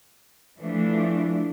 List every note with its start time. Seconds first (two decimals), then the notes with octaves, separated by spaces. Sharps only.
0.57 E3 F3 A3 D4